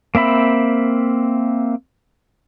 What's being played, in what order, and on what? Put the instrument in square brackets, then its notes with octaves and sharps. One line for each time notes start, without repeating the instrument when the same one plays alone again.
[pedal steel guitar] A#3 C4 E5 B5